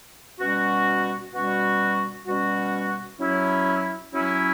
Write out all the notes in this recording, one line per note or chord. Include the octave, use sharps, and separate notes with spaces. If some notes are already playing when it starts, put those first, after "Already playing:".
B2 G3 C#4 F#4
B2 G3 C#4 F#4
B2 G3 C#4 F#4
F#3 C#4 E4
F#3 C#4 E4